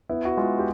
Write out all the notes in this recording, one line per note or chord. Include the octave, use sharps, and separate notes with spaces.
B3 E4
F#4
G#3 F4
G4